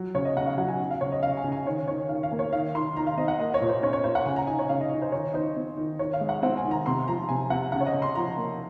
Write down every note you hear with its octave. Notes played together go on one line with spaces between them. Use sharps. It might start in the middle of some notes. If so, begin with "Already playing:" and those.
Already playing: F#3
C#3 C#5
D#5
C#3 F#5
F5
F#3 F#5
G#5
C#4
F5
C#3 C#5
D#5
C#3 F5
G#5
C#3
G#5
D#3 C#5
D#3 C#5
D#3 F5
F5
A#3
C#5
D#3 F5
D#3 C6
D#3 A#5
F5
C4 D#5
F#5
A#3 D#5
C#5
A#2
C5
C#4 C#5
C#5
A#2 C5
F#5
C#3 G#5
A#5
D#4 G#5
C#5
C#3 F5
D#5
D#4
C5
D#3 C#5
D#4 C5
C4
D#3
D#3 C#5
F5
G#3
F#5
C4 F#5
G#5
D#3
A#5
C3 C6
F3 A#5
C3 G#5
C3 F#5
C#3 F#5
C#5
D#5
C#3
C6
F3 A#5
A#3